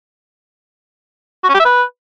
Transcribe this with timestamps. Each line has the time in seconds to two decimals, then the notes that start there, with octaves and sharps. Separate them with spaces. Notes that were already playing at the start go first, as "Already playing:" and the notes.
1.44 F#4
1.49 C#4
1.55 G4
1.60 E5
1.65 B4